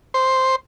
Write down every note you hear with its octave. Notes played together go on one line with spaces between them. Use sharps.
C5